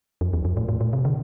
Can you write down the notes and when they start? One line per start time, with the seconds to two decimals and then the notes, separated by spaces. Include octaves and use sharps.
0.21 F2
0.33 E2
0.45 F2
0.57 A2
0.69 A2
0.81 A2
0.93 C3
1.05 D3